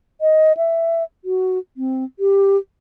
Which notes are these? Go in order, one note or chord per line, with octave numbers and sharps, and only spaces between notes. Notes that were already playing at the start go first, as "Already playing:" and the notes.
D#5
E5
F#4
C4
G4